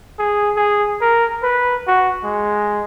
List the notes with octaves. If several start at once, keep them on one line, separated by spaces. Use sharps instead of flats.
G#4
G#4
A#4
B4
F#4
G#3